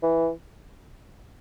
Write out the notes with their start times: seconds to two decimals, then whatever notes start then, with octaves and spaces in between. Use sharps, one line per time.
0.02 E3